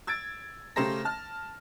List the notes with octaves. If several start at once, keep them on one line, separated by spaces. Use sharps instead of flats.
E6 G#6 A6 D7
C#3 A3 G4 C5 A#5 A#6
A5 F6